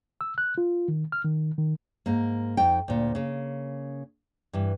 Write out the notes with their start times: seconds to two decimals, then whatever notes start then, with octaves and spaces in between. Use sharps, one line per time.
0.21 E6
0.38 F#6
0.58 F4
0.88 D#3
1.12 F6
1.25 D#3
1.58 D#3
2.06 G#2 A#3
2.57 F2 D#4 G5
2.88 D2 A#2
3.15 C#3 A#3
4.53 G2 E3